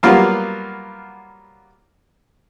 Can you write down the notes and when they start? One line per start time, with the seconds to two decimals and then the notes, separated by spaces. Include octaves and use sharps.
0.03 F#3 G3 A#3 B3 F4